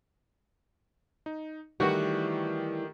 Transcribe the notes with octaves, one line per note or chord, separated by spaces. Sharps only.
D#4
D#3 E3 G3 A3 F#4 G4